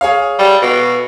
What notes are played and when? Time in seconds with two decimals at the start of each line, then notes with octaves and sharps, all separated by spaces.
0.01 G#4 C#5 F5
0.39 G3
0.62 B2